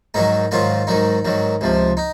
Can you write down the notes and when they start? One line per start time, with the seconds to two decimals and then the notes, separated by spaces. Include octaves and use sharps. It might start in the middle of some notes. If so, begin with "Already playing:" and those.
0.14 G#2 D#3 F#3 D#4
0.51 G#2 D#3 F#3 F4
0.87 G#2 D#3 F#3 D#4
1.25 G#2 D#3 F#3
1.61 C#2 C3 F3
1.97 D#4